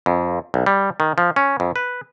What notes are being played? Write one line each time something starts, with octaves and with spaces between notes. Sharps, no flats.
F2
B1
G3
D#3
F3
C#4
F2
B4